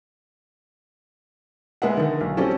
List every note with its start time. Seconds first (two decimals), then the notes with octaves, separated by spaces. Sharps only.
1.82 G#3 B3 E5 F#5
1.97 D3 D#3
2.21 B1
2.37 G3 C4 C#4 F#4 G4 A4